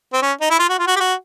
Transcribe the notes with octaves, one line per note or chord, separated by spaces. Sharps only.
C4
C#4
D#4
E4
F4
F#4
F4
F#4
G4
F#4